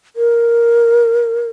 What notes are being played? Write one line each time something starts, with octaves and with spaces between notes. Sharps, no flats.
A#4